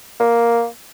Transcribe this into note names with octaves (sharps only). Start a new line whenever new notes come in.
A#3